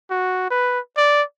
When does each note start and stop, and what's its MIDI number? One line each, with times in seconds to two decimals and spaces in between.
0.10 0.45 66
0.50 0.79 71
0.97 1.22 74